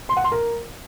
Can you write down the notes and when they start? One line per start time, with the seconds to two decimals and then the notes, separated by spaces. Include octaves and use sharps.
0.09 C6
0.17 F#5
0.24 C6
0.32 A#4